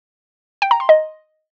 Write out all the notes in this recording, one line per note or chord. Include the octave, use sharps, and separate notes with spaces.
G5
A#5
C6
D#5